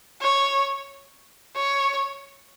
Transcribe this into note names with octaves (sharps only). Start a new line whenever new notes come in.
C#5
C#5